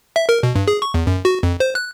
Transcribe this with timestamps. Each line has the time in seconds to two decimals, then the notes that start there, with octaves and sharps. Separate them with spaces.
0.16 E5
0.29 A#4
0.43 B2
0.55 G2
0.68 G#4
0.82 C#6
0.94 E2
1.07 F#2
1.25 F#4
1.43 F2
1.60 C5
1.75 F#6